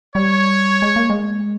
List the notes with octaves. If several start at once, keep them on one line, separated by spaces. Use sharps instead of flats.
G3 C#5
G#3
A#3
G#3